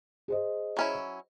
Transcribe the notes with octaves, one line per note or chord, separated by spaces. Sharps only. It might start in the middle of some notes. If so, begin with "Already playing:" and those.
G#4 C5 D#5
F#3 C#4 E4